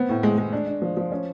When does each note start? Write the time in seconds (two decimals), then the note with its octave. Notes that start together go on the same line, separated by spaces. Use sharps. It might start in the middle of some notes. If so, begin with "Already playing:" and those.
Already playing: B3 C4
0.09 A2
0.23 G#3
0.38 G#3
0.53 D4
0.67 D4
0.82 F3
0.97 F3
1.12 C#4